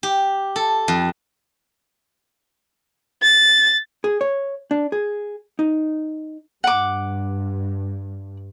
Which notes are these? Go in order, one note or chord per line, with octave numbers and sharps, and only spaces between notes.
G4
A4
F2
A6
G#4
C#5
D4
G#4
D#4
G2 F#5 D6